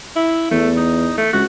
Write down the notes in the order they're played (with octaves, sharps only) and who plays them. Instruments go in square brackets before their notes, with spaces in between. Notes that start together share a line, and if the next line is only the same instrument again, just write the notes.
[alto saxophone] E4
[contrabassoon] E2 [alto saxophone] A3
[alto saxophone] D#4
A3
[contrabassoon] C#2 [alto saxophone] F#4